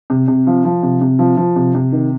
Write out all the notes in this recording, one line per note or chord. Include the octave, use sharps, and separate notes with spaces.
C3
C3
F3
F3
C3
C3
F3
F3
C3
C3
D#3